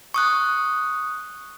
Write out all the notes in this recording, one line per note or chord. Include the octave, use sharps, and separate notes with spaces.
C#6 D#6 F#6